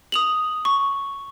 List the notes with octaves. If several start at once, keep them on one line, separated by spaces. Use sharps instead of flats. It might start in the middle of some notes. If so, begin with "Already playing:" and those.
D#6 F7 F#7
C#6